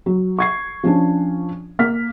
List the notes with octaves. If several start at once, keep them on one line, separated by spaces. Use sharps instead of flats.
F#3
C#6 G#6 C7
F3 C#4 D4
A#3 F6 B6